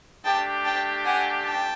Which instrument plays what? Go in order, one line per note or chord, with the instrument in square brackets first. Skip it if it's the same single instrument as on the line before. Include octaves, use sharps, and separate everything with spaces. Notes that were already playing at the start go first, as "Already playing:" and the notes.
[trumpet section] A3 D4 G4 [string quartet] G5 A5
[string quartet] G5 A5
F#5 G#5
G5 A5